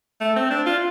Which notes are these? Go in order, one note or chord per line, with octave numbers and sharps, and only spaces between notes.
A3
C4
D4
F4